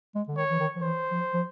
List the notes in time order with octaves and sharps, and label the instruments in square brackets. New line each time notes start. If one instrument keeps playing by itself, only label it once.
[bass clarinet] G#3
D3
[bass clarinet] D#3 [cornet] C#5
[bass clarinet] E3
D#3
F3
[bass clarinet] E3 [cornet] C5
[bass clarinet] F3
F3